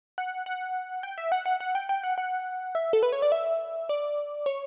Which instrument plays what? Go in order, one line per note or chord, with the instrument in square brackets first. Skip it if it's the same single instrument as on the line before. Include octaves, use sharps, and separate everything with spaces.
[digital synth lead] F#5
F#5
G5
E5
F#5
F#5
F#5
G5
G5
F#5
F#5
E5
A4
B4
C#5
D5
E5
D5
C#5